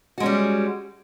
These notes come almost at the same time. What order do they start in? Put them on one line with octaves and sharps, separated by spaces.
F#4 G#3 C#4 G3